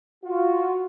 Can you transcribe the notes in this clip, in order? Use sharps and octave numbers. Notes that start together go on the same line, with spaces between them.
F4 F#4